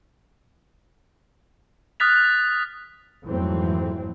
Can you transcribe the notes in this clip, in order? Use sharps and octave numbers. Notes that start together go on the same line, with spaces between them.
D#6 F6 F#6 A6 B6 F7
F2 G#2 E3 F#3 A3 C4